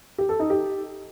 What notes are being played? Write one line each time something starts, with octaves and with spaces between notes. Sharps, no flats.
G4
A4
D#4
G4